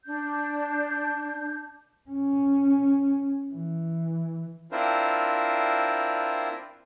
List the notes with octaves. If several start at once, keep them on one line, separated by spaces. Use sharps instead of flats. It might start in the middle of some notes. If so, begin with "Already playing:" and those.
D4 G6
C#4
E3
C4 D4 E4 F4 A#4 C5